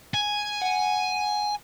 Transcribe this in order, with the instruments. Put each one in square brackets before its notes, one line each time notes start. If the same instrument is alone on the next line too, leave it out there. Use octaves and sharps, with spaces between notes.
[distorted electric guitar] G#5
[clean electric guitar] F#5